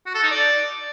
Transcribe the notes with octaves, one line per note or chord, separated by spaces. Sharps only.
F#4
A4
D#4
D5